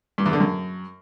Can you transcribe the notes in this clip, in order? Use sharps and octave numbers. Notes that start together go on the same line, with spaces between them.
G2
E2
D3
F#2